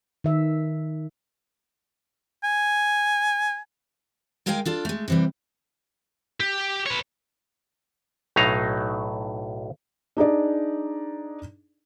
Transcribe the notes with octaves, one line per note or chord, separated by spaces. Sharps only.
D#3 E5
G#5
D#3 G#3 A#4 F5 G5 G#5
D4 F4 A4
G#3 A3
C3 E3 G3
G4
B4 C#5
B1 A2 F#3 D#4 F5 A#5
D4 D#4 G#4 D5